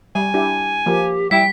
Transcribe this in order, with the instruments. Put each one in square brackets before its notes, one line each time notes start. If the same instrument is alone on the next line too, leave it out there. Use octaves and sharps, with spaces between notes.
[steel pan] G3 [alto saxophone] G#5
[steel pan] D4 E4 G4
[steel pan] F3 A#3 [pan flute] G4
[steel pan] G3 [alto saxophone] E4 [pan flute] G5 [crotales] B6